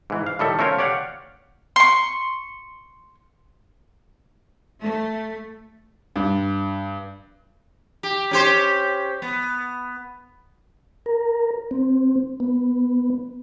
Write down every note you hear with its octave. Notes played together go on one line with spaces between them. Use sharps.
G#2 E3
F5
A2 D#3 G3 A4 E5
A3 C#4 F4 A#4 C5 C#5
G4 C#5 D5 F5 F#5
C6 C#6
A3
G2
G4
C#4 G4 C5
B3
A#4
C4
B3